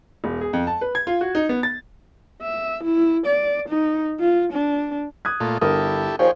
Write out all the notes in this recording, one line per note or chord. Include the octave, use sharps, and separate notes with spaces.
E1
G#4
F2
A5
B4
G#6
F4
F#4
D#4
B3
A6
E5
E4
D5
D#4
F4
D4
D#6 F#6 G#6
A#2 A3 F4
G1 E4 G4 A4 A#4 D#6
D#2 A#2 F3 G#4 C#5 G5